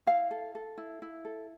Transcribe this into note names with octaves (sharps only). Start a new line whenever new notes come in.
E4 F5
A4
A4
E4
E4
A4